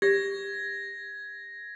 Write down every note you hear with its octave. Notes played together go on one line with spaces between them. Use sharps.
G4 G#6 A#6